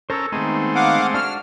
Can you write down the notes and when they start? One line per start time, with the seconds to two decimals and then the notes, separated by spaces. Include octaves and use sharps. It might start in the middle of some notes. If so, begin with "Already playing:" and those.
0.10 C#4 A4 A#4 C5 E6
0.32 D#3 G#3 A3 B3 C4 D#4
0.75 F5 F#5 D6
1.14 D4 F#4 F6